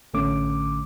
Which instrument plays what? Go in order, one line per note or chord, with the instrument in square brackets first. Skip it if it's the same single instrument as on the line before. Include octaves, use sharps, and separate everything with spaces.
[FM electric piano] A1 D3 A3 C#4 D6